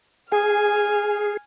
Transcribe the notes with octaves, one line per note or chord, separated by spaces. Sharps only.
G#4 G#5 F6